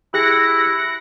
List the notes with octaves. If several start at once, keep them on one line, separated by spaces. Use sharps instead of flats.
E4 G4 G#4 F#6 A#6 C#7